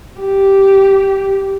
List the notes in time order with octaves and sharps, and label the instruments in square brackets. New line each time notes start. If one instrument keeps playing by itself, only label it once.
[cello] G4